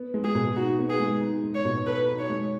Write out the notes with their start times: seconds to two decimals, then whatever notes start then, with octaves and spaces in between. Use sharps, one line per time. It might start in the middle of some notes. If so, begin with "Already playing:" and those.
Already playing: B3
0.14 G#3
0.24 G#4
0.35 B2
0.56 D#4 F#4
0.79 B3
0.90 G#4
0.99 G#3
1.21 D#4
1.43 G#3
1.55 C#5
1.65 B2
1.87 A4 B4
2.08 D#4
2.19 C#5
2.29 G#3